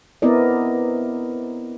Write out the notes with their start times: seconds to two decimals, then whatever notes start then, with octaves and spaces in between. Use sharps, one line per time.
0.22 B3 C4 E4 A#4 D5 D#5